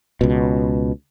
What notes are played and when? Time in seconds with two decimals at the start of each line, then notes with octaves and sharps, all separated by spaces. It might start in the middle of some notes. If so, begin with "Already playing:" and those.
0.21 C#2 B2